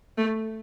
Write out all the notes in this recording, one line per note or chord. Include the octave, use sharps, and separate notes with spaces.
A3